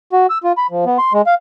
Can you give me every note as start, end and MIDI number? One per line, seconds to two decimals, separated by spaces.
0.13 0.27 66
0.30 0.38 88
0.44 0.52 65
0.58 0.67 83
0.71 0.85 53
0.86 0.98 59
0.98 1.13 84
1.13 1.22 56
1.27 1.34 77